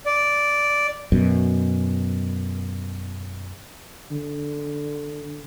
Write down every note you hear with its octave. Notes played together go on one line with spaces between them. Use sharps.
D5
F#2 B2
D3